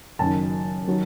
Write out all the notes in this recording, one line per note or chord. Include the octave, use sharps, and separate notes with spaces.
F#1 F#2 D#3 A5
D#3 F#3